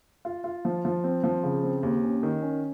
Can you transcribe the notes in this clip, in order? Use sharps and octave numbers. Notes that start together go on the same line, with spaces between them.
F4
F4
F3
F3
C4
F3
C#3
C4
D#2
C#4
D#3
C#4